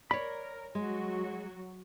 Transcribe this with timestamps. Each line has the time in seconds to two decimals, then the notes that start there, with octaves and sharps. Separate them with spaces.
0.11 A#4 C#5 D5 B5
0.75 F#3 G#3 F#4